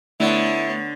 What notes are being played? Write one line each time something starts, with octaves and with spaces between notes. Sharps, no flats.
D3 A3 B3 E4 C#5 A6